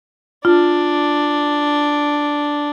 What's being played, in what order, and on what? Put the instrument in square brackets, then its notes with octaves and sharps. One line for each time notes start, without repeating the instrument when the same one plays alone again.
[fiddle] D4 [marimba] F4